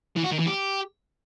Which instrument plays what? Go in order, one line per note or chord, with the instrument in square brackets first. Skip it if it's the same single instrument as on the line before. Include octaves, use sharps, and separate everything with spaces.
[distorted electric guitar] E3
F#4
D#3
E3
G4